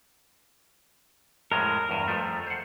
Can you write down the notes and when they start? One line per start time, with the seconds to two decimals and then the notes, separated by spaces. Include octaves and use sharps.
1.52 F2 A2 G#3 A#4
1.90 E2 G2
2.08 F2 F3 A3
2.46 C5 F#5